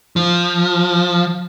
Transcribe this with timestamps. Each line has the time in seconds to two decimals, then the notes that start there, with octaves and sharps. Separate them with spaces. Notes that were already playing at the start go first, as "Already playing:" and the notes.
0.16 F3